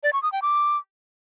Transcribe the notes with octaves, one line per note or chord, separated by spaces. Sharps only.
D5
C#6
D#6
G5
D6